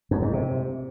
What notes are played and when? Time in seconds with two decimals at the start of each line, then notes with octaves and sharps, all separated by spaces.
0.11 F#2
0.22 G#2
0.33 C3